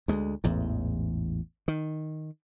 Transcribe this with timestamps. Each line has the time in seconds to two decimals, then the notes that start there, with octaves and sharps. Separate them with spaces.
0.08 D2 G#3
0.44 A1 E2 G#2
1.68 D#3